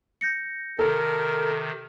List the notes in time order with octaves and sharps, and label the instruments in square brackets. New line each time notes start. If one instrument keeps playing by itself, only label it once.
[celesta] G6 A#6 C#7
[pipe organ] C3 D#3 [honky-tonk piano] A4 [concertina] A#4